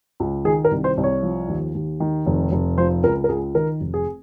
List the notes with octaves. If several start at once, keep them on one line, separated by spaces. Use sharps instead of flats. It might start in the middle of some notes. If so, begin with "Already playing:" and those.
C#2
D#3 G#4
A#4
C2
C5
C2
C#5
F3
D#2
D#2
D#3
F1
F1
F3 C5
C#2 A#4
A#4
C#2 G#4
D#3 A#4
F1
G#4